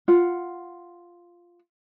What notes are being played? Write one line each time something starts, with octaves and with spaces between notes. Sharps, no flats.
F4 F#5